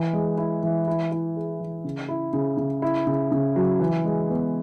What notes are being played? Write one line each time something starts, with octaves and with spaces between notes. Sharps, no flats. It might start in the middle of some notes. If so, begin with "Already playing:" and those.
Already playing: E3
G#3
E4
E3
E4
E4
G#4
E3
C#3
E4
C#3
C#3
E4
C#3
C#3
F#3
E3
G#3
B3